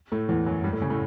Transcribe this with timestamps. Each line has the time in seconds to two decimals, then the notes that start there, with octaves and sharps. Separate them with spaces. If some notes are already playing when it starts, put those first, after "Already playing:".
0.12 A2 A3
0.29 E2 E3
0.46 F#2 F#3
0.64 G2 G3
0.73 A2 A3
0.82 C#3 C#4
0.90 A2 A3